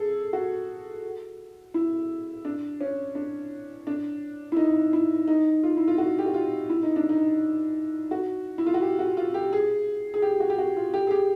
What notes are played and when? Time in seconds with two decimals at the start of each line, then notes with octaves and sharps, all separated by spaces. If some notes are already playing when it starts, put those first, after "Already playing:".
Already playing: G#4 A4
0.33 F#4
1.74 E4
2.45 D4
2.81 C#4
3.15 D4
3.87 D4
4.52 E4
4.57 D#4
4.93 E4
5.28 D#4
5.63 F4
5.77 E4
5.88 F4
5.98 F#4
6.19 G4
6.26 F#4
6.34 F4
6.69 E4
6.83 D#4
6.96 D4
7.09 D#4
8.11 F#4
8.58 E4
8.66 F4
8.74 F#4
8.82 G4
8.99 F#4
9.17 F4
9.34 G4
9.53 G#4
10.14 G#4
10.22 G4
10.40 F#4
10.50 G4
10.58 F#4
10.77 F4
10.94 G4
11.07 G#4
11.11 G4